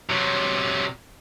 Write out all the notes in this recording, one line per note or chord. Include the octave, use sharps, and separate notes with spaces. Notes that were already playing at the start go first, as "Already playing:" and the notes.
C3 F#3